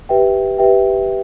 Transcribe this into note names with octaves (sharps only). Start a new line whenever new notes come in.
G4 B4 E5 G5
G4 B4 E5 G5